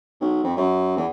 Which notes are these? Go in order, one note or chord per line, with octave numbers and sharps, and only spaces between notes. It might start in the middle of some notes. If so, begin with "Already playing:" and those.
B1
F2
F#2
E2